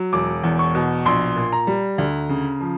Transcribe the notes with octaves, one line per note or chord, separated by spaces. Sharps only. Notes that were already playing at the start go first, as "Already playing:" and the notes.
Already playing: F#3
E1 D6
E2
C#6
B2
A#1 C6
A#2
A#5
G3
D2
C#3
F3